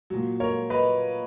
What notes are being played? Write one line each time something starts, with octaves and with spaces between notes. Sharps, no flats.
A#2 F#3
A#4 C#5
B4 D#5